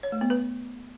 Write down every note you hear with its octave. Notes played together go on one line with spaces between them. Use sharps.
C#5
A3
B3
B4